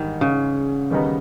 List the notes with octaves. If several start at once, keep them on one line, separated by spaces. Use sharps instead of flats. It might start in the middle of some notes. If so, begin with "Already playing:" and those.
Already playing: G#2 D#3 E3 G3
C#3
E2 D#3 G3 B3 D#4